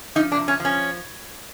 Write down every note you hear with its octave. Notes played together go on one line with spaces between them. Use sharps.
F3 D#4
D4
C3
C#4
F3 C#4